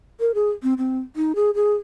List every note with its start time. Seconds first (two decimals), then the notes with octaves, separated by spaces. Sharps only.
0.20 A#4
0.34 G#4
0.63 C4
0.78 C4
1.16 D#4
1.35 G#4
1.55 G#4